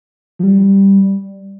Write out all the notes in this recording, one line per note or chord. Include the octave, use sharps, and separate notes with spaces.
F3
G3